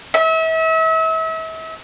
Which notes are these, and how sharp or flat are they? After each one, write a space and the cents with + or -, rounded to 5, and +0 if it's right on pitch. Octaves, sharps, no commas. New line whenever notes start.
E5 -35